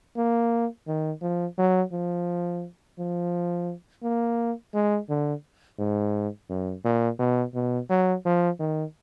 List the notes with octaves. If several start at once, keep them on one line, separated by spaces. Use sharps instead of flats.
A#3
D#3
F3
F#3
F3
F3
A#3
G#3
D3
G#2
F#2
A#2
B2
B2
F#3
F3
D#3